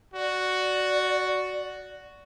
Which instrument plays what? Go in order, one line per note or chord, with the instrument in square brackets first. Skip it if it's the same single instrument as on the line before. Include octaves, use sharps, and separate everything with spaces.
[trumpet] F#4 [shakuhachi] D5